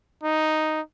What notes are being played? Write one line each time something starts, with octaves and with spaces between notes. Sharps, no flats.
D#4